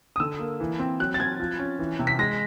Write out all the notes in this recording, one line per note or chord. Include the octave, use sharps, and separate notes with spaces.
D#6
D3 E6
A#3
E3
C4
F#3 F#6
A6
C4 G#6
F3
C#4
E3
C3
B6
G#3 A#6